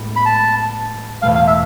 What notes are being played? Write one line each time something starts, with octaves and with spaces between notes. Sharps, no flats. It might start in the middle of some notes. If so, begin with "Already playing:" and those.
Already playing: A2 G#3 B3 D4
B5
A5
E2 B2 A3 F5
F5
E5